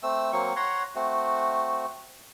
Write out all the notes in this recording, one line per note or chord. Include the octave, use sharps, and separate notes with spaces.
A3 C4 E6
F#3 A#3 C4 C#6
C#5 F#5 A#5 C6
A3 C4 F#4